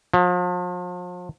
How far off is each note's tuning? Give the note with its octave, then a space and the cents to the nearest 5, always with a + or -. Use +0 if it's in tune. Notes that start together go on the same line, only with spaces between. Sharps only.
F3 +40